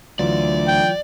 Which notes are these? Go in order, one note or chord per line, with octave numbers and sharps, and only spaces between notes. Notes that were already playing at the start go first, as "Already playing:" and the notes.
D2 E3 F#3 F4 D5
G5